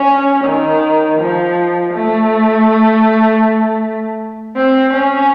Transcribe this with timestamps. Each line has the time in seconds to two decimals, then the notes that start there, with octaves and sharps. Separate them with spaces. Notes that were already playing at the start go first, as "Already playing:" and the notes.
Already playing: C#4
0.44 D#3
1.19 F3
1.94 A3
4.56 C4
4.93 C#4